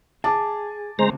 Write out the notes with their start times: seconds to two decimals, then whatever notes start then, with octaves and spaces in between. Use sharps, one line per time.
0.24 G#4 A5 D6
0.99 D2 C#3 G#3 C4 C5 A#5